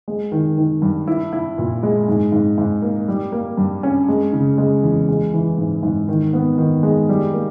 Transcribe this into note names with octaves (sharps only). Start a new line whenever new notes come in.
G#3
D#3
D#3
G2
E4
E4
A#2
G#3
G#2
G#2
G#2
A#3
G3
A#3
G2
C#4
G#3
C#3
G#3
E2
G#3
E3
G#2
G#2
D#3
B3
D#3
G#3
G3
A#3